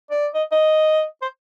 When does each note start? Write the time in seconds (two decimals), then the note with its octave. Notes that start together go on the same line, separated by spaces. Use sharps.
0.11 D5
0.34 D#5
0.52 D#5
1.22 C5